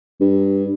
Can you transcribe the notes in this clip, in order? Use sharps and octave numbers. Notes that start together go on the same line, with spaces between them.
G2